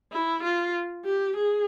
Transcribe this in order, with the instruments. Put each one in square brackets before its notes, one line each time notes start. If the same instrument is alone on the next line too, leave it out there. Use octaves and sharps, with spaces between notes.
[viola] E4
F4
G4
G#4